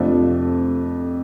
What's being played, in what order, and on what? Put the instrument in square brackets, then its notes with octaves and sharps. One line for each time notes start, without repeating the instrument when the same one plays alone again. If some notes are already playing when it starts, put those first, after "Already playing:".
Already playing: [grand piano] F2 C3 A3 D4 F4